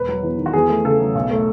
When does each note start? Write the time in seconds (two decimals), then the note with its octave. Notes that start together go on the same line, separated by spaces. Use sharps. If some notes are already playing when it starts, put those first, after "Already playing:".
Already playing: E1 B4
0.09 F#3
0.23 E2
0.38 D#3
0.46 F#4
0.53 E2 G#4
0.69 A3
0.84 C#3 A4
1.00 F#3
1.15 B1
1.31 A3